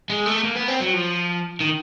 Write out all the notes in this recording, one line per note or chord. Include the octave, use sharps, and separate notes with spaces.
G#3
A3
A#3
B3
C4
F#3
F3
D#3